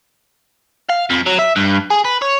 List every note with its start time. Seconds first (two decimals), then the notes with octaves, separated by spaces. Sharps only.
0.89 F5
1.10 F2
1.26 F#3
1.39 E5
1.56 G2
1.90 G#4
2.05 B4
2.22 C#5